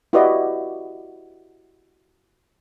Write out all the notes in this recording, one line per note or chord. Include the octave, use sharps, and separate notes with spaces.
E4 F#4 G4 B4 D5 D#5